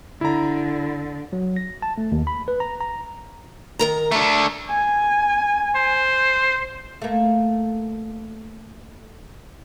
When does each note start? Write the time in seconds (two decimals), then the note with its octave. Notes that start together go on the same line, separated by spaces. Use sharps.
0.21 D3 E4 A#5
1.33 F#3
1.56 A#6
1.82 A5
1.98 A3
2.12 D#2
2.27 B5
2.48 B4
2.60 A#5
2.81 A#5
3.79 D#3 A#4 A#5
4.12 A3 D4 A#5
4.70 G#5
5.75 C5
7.02 A3 A#3